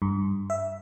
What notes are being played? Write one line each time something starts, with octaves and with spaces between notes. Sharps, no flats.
G2
E5